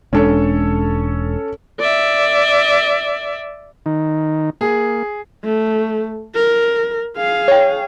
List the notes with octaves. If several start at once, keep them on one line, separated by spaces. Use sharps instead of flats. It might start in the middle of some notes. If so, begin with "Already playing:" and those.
E1 G#3 C#4 D4 A4 C#5
D5 E5
D#3 D#4
A#3 G#4
A3
A#4
G#4 F5
C#5 G5